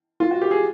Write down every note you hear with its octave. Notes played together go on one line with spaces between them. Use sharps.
F4
F#4
G4
G#4